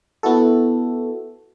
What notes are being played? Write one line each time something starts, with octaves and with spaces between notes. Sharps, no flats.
B3 E4 F#4 A4